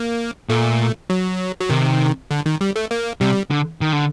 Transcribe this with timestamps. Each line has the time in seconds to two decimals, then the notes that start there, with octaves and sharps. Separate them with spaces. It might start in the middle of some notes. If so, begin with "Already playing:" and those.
Already playing: A#3
0.49 A#2 A3
1.10 F#3
1.60 F#3
1.70 C3 D#3
2.31 D3
2.46 D#3
2.61 G3
2.76 A3
2.91 A#3
3.21 C3 G3
3.51 D3
3.81 D#3
3.93 D3